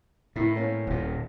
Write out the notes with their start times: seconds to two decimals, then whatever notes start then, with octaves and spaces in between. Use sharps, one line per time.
0.36 A2 D#3 E4
0.56 A#3 C4 C#4
0.87 D#1 A#2